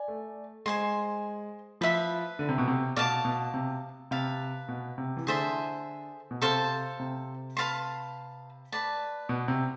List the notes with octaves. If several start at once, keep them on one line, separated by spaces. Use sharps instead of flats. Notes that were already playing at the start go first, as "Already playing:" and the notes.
Already playing: D5 G#5
A3
G#3 C5 G#5 C6
F3 B4 E5 B5
D3
C3
B2
C3
B2 D5 F5 A5 D6
B2
C3
C3 B4 F5 A5
B2
C3
E3
D3 G#4 C5 E5 A5
B2
C3 A4 C5 F5 A5
C3
B4 F5 A5 C6
B4 D5 A5
B2
C3